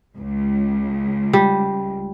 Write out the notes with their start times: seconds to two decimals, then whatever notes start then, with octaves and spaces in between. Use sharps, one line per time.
0.16 C#2
1.33 G3